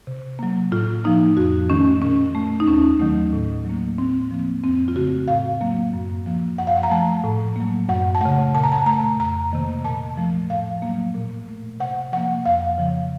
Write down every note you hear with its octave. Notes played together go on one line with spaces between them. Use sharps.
C3
F#3 A#3
A2 F4
F3 A#3 D#4
F2 F#4
D#3 A3 C#4
A#2 C#4
A3
D#4
D#2 C#4
D#3 F#3 A3
A2
F#3 A#3
A2 C4
F3 A#3
F2 C4
F4
C#3 A3 F#4
A2 F5
F#3 A#3
F#2
F3 A#3
F#2 F#5
F5
F#5
A#5
F3 A3 A5
A2
F#3 A#3
F#2 F#5
A5
C#3 A3 F#5
A#2 A5
A#5
A5
A3 A#5
F2 A#5
C3 D#3 A#3
A#2 A5
F3 A3
A2 F5
F#3 A#3
A#2
A3
C3 F#5
F3 A#3 F#5
F2 F5
C#3 F3